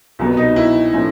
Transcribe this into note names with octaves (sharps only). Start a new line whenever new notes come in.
C2 B2 F#3 B3
D#4
E4
A2 F3 A3 C#4